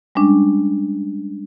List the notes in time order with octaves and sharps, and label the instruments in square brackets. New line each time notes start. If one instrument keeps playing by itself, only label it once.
[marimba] G3 G#3 C#4 D4